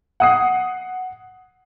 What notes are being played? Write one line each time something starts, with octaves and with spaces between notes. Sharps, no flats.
F#5 D#6 C7